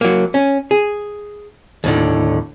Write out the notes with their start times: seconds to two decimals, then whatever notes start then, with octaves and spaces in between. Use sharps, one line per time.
0.01 F#3 A#3
0.34 C#4
0.71 G#4
1.84 D#2 A2 D3